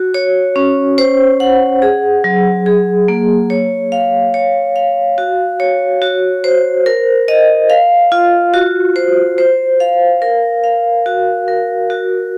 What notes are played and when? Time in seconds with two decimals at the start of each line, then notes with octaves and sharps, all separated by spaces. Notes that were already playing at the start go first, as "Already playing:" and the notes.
Already playing: F#4
0.14 C#5
0.56 C#4
0.98 C5
1.40 F#5
1.82 G#4
2.24 F#3
2.66 G#4
3.08 A#3
3.50 C#5
3.92 F5
4.34 C#5
4.76 F5
5.18 F#4
5.60 C#5
6.02 F#4
6.44 C5
6.86 A#4
7.28 D#5
7.70 F5
8.12 F4
8.54 F#4
8.96 C5
9.38 C5
9.80 F5
10.22 A#4
10.64 F5
11.06 F#4
11.48 A#4
11.90 F#4